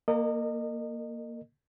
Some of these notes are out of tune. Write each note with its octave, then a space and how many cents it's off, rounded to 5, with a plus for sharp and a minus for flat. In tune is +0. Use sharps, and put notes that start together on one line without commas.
A#3 +0 A#4 -40 D#5 -25